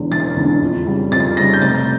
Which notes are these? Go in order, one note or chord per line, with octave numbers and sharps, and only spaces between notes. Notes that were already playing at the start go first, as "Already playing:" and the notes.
Already playing: E1 E2 D3
E1 A6
E2 D3
F2
C#3 G3
F2 A6
C#3 G3 A#6
G6
F1 A6